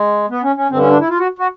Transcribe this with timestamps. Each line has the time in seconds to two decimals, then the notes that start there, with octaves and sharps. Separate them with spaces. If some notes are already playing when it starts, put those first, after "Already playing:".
Already playing: G#3
0.30 B3
0.43 C#4
0.56 C#4
0.69 G2 D3 C4
0.79 C#4
0.89 D4
0.99 E4
1.09 F4
1.18 F#4
1.39 F#4